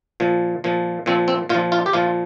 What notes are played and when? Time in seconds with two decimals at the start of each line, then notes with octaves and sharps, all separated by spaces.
0.20 A#2 F3
0.64 A#2 F3
1.06 A#2 F3 C4
1.28 C4
1.49 A#2 F4
1.54 F3
1.72 F4
1.86 G4
1.93 A#2 F3 F4